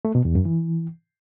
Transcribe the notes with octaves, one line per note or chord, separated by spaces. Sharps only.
A3
B2
E2
F#2
E3